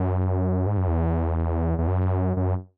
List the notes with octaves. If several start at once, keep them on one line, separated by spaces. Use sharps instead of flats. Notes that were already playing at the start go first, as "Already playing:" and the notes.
Already playing: F#2
G#2
F#2
E2
E2
F#2
F#2